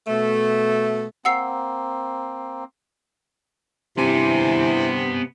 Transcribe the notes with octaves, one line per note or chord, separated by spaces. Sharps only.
B2 A3
A#3 C4 F#5 E6 C7
G2 C3 B3 E4 G#5